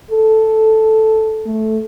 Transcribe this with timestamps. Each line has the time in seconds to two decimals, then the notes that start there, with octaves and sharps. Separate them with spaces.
0.11 A4
1.46 A3